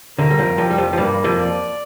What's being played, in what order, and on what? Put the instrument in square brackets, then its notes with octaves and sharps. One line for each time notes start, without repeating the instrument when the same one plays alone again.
[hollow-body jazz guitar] D2 D3 [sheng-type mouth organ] A#4
[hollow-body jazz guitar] G3
F2 F3
[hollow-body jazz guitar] F2 F3 [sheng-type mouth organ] G4
[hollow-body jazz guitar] G3
F2 F3
F3
[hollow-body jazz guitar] G2 G3 [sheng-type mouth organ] A#3
[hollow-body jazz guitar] F2 F3
[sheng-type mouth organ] D5